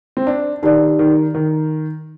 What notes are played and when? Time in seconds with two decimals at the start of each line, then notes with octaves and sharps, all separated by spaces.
0.17 C4
0.27 D4
0.63 D#3 D#4 G4 D5
0.99 D#3
1.34 D#3